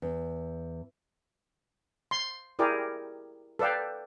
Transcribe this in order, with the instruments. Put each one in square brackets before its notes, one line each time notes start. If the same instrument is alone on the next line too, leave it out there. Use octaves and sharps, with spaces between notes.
[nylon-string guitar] E2
[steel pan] C6
E4 G4 G#4 A#4 D5
A4 B4 D5 F5 G5